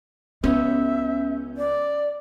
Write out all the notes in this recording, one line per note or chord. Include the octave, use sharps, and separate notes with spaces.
C#2 B3 C#4 E5 G6
D5